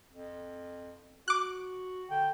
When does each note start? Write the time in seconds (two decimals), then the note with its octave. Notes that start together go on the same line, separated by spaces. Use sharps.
0.11 F2
1.28 F#4 D6 F#6
2.11 D3 G5